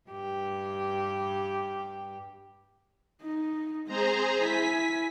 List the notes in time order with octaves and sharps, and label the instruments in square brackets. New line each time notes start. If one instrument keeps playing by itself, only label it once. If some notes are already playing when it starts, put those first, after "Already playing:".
[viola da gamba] G2 G4
[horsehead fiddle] D#4
[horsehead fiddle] G#3 C4 [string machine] G#4 C5 A#5
[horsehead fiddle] E4 G#5 [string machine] B6